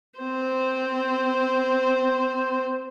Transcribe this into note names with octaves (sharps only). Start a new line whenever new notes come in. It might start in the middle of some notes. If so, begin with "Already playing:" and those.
C4 C5